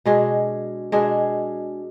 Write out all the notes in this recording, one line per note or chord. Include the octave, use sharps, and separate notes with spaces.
B2 G#3 D4 G#4
B2 G#3 D4 G#4